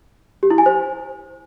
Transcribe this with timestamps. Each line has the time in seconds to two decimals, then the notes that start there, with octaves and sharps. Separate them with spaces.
0.43 G4
0.50 E4
0.58 G#5
0.66 C5